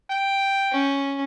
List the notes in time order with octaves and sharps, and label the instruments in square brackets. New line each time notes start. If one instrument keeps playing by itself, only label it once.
[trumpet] G5
[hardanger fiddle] C#4